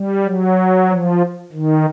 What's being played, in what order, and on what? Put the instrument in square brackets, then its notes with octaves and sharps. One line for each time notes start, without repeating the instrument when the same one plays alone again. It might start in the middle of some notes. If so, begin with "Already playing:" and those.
Already playing: [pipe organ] G3
F#3
F3
D#3